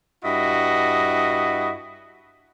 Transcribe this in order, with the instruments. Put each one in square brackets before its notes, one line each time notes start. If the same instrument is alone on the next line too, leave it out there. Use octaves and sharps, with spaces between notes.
[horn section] G2 E4 F#4 D#5